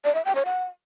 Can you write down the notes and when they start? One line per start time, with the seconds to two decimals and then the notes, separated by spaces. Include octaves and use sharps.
0.05 D5
0.15 E5
0.25 G5
0.35 C#5
0.45 F#5